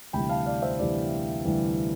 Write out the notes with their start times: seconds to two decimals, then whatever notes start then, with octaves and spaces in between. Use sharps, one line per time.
0.13 D2 C3 E3 G3 G5 B5
0.29 F5 A5
0.46 D5 F5
0.62 C5 E5
0.79 D2 C3 E3 G3 D5
1.45 D2 C3 E3 G3